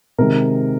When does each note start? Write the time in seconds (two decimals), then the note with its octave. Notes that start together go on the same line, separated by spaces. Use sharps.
0.18 C3 D#3 G#3 A#4